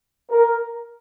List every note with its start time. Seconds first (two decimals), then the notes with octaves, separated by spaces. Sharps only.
0.30 A#4